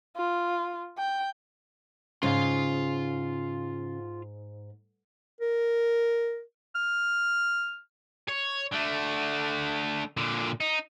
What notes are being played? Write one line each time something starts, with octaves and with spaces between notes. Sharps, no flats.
F4
G5
G#2 C#3 F4 F5
A#4
F6
C#5
D3 A3
A#2 D3
D#4